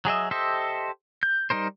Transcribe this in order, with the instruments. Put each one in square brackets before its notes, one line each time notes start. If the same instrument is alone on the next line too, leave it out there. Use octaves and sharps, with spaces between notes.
[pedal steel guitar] F#3 G#4 D#5 E5
G4 A4 C5 D#5 E5
G6
G3 D#4 A#4 C5